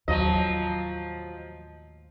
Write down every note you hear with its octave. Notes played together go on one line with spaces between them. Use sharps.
D#2 A2 F3 F#3 D#5